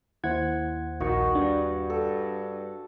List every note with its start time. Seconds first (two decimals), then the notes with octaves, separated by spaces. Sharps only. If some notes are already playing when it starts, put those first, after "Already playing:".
0.24 D#2 E4 C5 F#5 G#6
1.00 A#1 D#3 F#4 C#6
1.35 G2 D4
1.90 A4